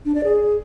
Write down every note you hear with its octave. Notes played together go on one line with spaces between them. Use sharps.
D4
D5
G#4